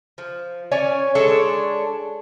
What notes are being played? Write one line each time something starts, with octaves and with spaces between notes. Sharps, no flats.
F3
C#4 C#5 D5 G#5
G#3 D4 A4 C#5